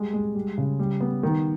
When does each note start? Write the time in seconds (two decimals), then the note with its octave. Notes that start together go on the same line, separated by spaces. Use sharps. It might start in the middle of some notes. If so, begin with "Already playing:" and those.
Already playing: G3 G#3
0.13 G#3
0.35 G3
0.58 C#3
0.79 G3
1.00 B3
1.23 D#3